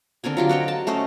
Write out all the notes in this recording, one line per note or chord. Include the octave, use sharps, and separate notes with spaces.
D3 C4 A#4 G#5
F#3 F4 G4
F#4 C#5 D#5 G5
A5
A3 C#4 C5 D#5